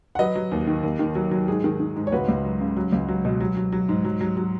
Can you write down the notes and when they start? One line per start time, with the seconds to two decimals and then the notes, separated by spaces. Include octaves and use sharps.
0.15 F#5
0.19 F#3 B4 D#5
0.35 F#3
0.52 D#2
0.67 D#3
0.83 D#2
0.99 D#3
1.15 F#3
1.31 F#3
1.48 G#2 D#4 G#4
1.64 D#3
1.80 D#3
1.96 G#2
2.07 C#5
2.12 C#2 F#4 B4
2.29 C#2
2.44 F#3
2.60 C#3
2.77 F#3
2.92 C#2
3.09 F#3
3.25 B2
3.41 F#3
3.57 F#3
3.73 F#3
3.89 G#2
4.05 F#3
4.21 F#3
4.37 F#3